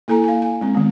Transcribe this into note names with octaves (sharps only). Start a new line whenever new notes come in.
A#3 E4 A4 G#5 A#5
F5 G#5
G#5
G#3 C4
D#3 G#3 B3